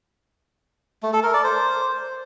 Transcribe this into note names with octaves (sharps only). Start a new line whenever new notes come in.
A3
A4
A#4
D5
C5